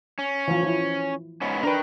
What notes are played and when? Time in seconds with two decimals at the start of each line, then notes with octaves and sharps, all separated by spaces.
0.19 C#4
0.48 E3 F3
0.63 F3 E4
1.41 G#2 B3 C#4
1.63 D4 A#4 B4 G5